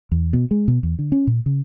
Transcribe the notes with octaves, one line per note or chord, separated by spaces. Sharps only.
E2
B2
G#3
B2
E2
D3
C#4
A#2
C#3